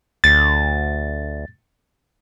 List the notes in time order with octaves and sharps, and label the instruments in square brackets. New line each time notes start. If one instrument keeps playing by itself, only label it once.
[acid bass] D2 [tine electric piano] A6